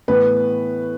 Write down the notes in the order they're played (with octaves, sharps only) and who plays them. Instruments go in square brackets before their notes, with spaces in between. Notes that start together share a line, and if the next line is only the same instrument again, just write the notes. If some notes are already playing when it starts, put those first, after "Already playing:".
[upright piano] A2 E3 B3 B4